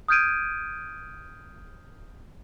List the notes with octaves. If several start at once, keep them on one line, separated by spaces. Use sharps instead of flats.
D#6 F6 G6 G#6 D7 D#7